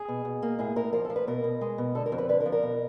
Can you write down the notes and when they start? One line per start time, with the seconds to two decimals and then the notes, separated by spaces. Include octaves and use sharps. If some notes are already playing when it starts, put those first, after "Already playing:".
Already playing: G#4
0.08 B2
0.25 B2
0.42 A#3
0.59 A2 G#4
0.76 A2 A#4
0.93 F3 A#4
1.05 A4
1.10 F3
1.16 B4
1.28 B2 A#4
1.44 B2
1.61 G#3
1.78 B2
1.95 D3 A4
2.06 A#4
2.12 F2
2.18 B4
2.29 D3 B4
2.40 A#4
2.46 F3
2.52 A#4
2.63 B2